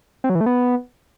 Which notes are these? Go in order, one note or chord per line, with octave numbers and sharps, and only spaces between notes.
C4
F#3
E3
A3
B3